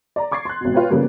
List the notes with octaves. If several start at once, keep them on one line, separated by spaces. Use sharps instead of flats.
D5 A#5
C#6 D6 G#6 A6 C7
C6 F#6
G#1 B2
F4 B4 C#5 G5
C#3 F3 G3 A#3 B3